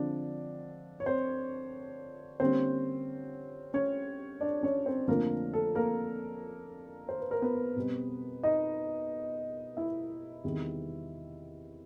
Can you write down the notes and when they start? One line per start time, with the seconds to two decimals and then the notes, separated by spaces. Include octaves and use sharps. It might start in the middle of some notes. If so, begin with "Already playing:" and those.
Already playing: D3 F3 G#3 C4 D4 D5
1.00 C#5
1.06 C4 C5
2.40 D3 G3 A#3 C4 C#4 C5
3.74 C#4 C#5
4.41 D4 D5
4.63 C#4 C#5
4.86 C4 C5
5.08 F2 D3 F3 A3 A#3 D4 A#4
5.53 A4
5.75 A#3 A#4
7.09 C5
7.20 B4
7.31 A#4
7.42 B3 B4
7.76 B2 G3 C4
8.43 D#4 D#5
9.77 E4 E5
10.44 E2 C3 D#3 G3